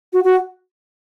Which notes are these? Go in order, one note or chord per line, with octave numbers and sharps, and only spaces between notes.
F#4
F#4